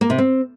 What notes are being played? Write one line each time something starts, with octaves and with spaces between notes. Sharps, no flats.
A#3
C3
C4